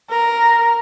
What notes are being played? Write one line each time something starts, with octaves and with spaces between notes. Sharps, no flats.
A#4